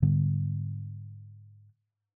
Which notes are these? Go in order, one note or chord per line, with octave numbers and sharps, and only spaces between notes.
G#2 D3 G3 B3